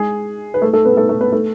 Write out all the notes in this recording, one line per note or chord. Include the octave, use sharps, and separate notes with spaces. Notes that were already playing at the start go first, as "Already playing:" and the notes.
Already playing: G#3 G#4
B4
A3 A4
A3 A4
B3 B4
A3 A4
A3 A4
B3 B4
A3 A4